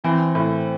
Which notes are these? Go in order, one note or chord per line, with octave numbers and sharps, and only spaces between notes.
E3 C4
A2